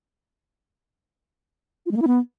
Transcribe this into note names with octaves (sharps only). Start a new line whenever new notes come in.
F4
G#3
A#3
E4
B3